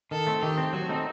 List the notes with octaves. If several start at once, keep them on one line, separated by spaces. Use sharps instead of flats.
D#3 A4
A3 C4
D#3 G4
A3 C4
F#3 F#4
A3 C4 D#4